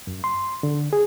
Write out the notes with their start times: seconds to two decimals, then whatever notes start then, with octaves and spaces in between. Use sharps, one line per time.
0.07 F#2
0.24 C6
0.63 D3
0.93 G#4